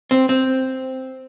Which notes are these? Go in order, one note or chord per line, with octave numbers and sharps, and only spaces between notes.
C4
C4